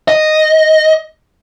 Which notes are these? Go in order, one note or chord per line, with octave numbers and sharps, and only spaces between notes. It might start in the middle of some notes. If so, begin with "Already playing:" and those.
D#5